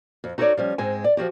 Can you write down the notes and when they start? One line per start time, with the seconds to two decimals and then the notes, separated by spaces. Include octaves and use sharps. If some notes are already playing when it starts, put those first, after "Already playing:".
0.24 F2
0.38 D#4 F#4 A4 B4 C#5 D5
0.57 F3 G3 C#4
0.78 G#2 G#3 C4 G#5
1.04 D5
1.17 F3 G3 F#4 G4